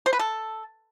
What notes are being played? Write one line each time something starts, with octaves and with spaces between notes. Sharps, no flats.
C5
B4
A4